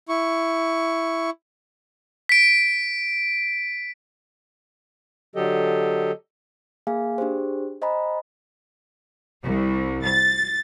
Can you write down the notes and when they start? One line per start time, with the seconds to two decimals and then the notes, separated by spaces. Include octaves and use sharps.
0.09 E4 C#6
2.29 B6 D7
5.36 D3 F#3 G4 A4 D#5
6.87 A#3 G#4 F5 G#5
7.18 D4 G4 G#4 C5
7.82 C5 D#5 G#5 A#5 B5
9.44 C2
10.05 A6